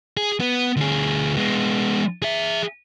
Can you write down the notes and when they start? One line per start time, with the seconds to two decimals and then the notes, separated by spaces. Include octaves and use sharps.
0.17 G#4
0.40 B3
0.77 D2 G#4
1.37 G#3 B3
2.22 G#4 E5